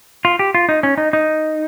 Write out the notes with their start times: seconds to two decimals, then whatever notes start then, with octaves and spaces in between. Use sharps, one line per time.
0.25 F4
0.39 G4
0.55 F4
0.69 D#4
0.83 C#4
0.98 D#4
1.13 D#4